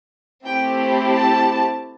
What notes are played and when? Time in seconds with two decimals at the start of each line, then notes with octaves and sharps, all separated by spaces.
0.46 A3 C4 E4 G4 G5
1.16 A5